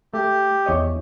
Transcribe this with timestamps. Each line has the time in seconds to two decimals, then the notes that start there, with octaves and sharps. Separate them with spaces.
0.14 A3 G4
0.66 E2 C#5 D#5